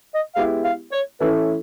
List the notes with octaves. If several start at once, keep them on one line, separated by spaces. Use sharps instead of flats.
D#5
G#3 B3 E4 G4 F5
F5
C#5
E3 A3 C#4 E4 A4 B4